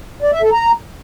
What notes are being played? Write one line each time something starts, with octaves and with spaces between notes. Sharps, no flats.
D5
E5
A4
A#5